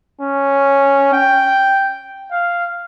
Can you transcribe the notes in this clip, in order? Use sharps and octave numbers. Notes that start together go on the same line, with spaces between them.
C#4
G5
F5